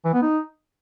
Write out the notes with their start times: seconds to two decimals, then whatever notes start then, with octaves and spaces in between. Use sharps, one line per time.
0.05 E3
0.14 B3
0.22 D#4